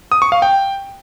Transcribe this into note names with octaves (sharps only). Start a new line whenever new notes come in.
D#6
C#6
F5
G5